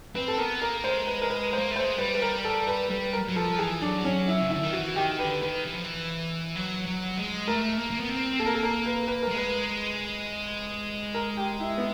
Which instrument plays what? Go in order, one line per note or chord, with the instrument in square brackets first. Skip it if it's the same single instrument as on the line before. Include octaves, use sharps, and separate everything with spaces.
[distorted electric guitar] C4 [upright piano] B4
[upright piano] A4
[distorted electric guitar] B3 [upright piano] A#4
[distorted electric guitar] A#3 [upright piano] A#4
[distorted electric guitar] G#3 [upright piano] C5
[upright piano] B4
A#4
B4
[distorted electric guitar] A#3 [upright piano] C5
[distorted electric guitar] A3 [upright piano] C5
[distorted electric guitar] G#3
[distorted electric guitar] G3 [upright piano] B4
[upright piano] B4
A#4
A4
B4
[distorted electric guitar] G3 [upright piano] B4
[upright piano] A#4
[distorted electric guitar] F#3
[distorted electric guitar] F3 [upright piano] A4
[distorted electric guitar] E3 [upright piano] G#4
[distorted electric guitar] F#3 [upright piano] D4
[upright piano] C#4
E4
[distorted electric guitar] C#3
[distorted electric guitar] D3 [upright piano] E4
[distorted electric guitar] D#3
[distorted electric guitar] E3 [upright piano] F#4
[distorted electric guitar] D#3 [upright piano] G4
[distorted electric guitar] D3 [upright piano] B4
[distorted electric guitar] D#3 [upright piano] B4
[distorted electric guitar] E3
F3
E3
F#3
F#3
G#3
[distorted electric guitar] A3 [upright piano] A#4
[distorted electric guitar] A#3
A#3
B3
C4
[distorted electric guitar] A#3 [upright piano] A4
[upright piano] A#4
A4
A#4
B4
B4
[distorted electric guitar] G3 [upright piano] A#4
[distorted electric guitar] G#3
[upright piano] B4
A#4
G4
E4
B3